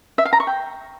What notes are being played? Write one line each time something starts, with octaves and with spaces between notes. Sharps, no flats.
E5
F5
A#5
C#6
G5